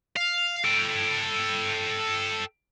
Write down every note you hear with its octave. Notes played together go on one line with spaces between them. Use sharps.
F5
A4 G5